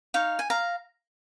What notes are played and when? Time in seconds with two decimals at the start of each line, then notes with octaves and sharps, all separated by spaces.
0.14 D#4 C#5 F5
0.39 G#5
0.50 F5 A#5